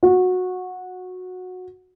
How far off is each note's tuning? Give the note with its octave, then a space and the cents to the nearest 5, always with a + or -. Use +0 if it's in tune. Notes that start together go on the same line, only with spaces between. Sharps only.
F#4 -15